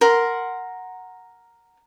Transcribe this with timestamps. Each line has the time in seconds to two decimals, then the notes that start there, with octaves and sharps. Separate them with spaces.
0.01 A#4 F#5 C6